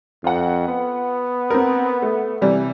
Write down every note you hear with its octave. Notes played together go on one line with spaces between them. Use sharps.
F2 F4 F#5
B3
C4 A#4
A3
C3 E3 G3